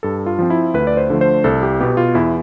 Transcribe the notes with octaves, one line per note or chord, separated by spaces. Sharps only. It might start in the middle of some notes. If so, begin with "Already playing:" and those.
G2 A4
F4
F3 C4
E4
D2 B4
D5
C5
D3 F3 A3
C5
C2 A4
G4
B2 B3 G4
F4
E2 E4